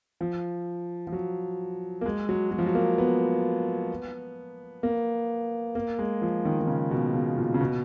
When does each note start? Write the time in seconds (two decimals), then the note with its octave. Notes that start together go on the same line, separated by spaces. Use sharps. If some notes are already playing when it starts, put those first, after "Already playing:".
0.21 F3
1.07 F3
1.12 F#3
2.01 A#3
2.06 G#3
2.29 F#3
2.51 F#3
2.58 F3
2.66 F#3
2.75 A#3
2.98 B3
4.83 A#3
5.75 A#3
5.99 G#3
6.22 F3
6.45 D#3
6.60 D#3
6.67 C#3
6.91 B2
7.14 C#3
7.37 A#2
7.54 C#3
7.61 B2